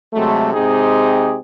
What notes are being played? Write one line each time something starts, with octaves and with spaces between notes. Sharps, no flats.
C3 F#3 G#3 A3
C3 G#3 C4 D#4 G4 G#4